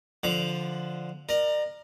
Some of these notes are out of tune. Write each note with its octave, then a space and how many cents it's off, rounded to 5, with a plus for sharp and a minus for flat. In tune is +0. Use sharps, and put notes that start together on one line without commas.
D3 +0 F3 +0 D6 +0
A#4 +5 D5 +40